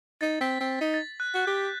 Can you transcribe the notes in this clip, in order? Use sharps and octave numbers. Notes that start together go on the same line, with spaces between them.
D#4 A6
C4 B6
C4
D#4
A6
F#6
F#4 F#6
G4 G6